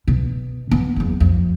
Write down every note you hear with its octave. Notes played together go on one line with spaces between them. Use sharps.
B2
B3
F#1 E2
F2